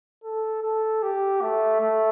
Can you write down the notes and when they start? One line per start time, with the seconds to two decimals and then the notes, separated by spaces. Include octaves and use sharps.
0.24 A4
0.62 A4
1.03 G4
1.42 A3
1.81 A3